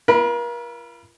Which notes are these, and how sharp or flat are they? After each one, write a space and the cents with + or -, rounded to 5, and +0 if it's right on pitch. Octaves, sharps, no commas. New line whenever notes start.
F4 -35 A#4 +40 B5 +0